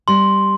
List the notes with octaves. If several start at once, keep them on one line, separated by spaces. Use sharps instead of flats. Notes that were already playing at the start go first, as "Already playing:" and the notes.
G3 C6